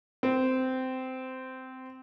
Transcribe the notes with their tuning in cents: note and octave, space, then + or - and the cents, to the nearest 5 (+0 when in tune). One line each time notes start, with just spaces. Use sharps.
C4 -15